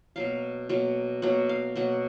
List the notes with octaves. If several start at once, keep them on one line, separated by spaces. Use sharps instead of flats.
B2 F#3 A#3 F5
B2 F#3 A#3
B2 F#3 A#3 F#5
F5
B2 F#3 A#3 F#5